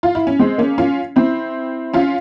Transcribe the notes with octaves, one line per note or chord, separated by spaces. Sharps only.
F4
E4
C#4
G#3 C4
A#3 C#4
C#4 F4
C4 E4
C#4 F4